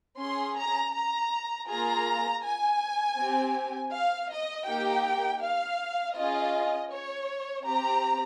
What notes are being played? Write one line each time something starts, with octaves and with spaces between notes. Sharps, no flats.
C#4 G#4 C6
A#5
A#5
A#3 F4 G#4 A#5
G#5
C4 G4
F5
D#5
A#3 D#4 G4 G5
F5
C#4 F4 G#4 D#5
C#5
C4 G4 A#5